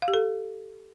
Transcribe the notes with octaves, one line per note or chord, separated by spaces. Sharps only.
F5
G4
A4